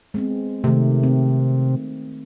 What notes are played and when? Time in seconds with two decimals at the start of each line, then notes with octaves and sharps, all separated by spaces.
0.14 G#3 B3 C4
0.64 C3 D#3 A3
1.03 C4